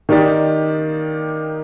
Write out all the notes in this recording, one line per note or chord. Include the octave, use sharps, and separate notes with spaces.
D#3 A#3 D#4 G4 D5